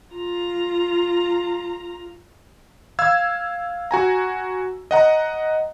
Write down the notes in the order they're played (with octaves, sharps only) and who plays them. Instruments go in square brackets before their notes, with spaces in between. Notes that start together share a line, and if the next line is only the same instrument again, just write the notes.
[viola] F4 A#5
[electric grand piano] F5 E6 G#6
F#4 G#5 A#5
D#5 F#5 A#5